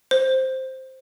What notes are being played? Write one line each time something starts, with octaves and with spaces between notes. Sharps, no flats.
C5